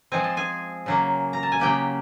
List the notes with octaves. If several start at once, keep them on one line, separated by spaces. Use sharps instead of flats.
F3 G#3 C4 G#5
A5
G#4 G#5
C#3 F#3 A#3
A#5
A5
G#5
C#3 F#3 A#3 G4 G5